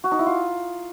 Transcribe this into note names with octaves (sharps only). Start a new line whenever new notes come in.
F#4
D#4
E4
F4